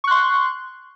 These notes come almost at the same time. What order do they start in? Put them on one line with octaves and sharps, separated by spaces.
C#6 F#6 C6